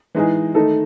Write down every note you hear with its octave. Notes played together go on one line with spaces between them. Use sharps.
E3 G#3 D#4 G#4
D#3 A3 D#4 A4